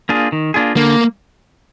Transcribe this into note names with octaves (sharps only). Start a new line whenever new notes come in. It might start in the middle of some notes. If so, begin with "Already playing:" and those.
A#3 D4 F4 G#4
D#3
A#3 D4 F4 G#4
D3 A#3